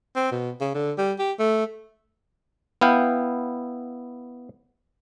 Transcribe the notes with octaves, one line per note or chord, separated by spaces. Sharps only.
C4
B2
C#3
D3
G3
G4
A3
B3 E4 F5 G5